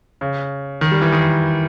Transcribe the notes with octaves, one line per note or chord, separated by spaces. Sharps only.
C#3
D#3
G3
E3
D#3